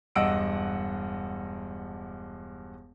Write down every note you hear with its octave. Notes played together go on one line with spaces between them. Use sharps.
E1 G2 D#5 F#5 E6 D7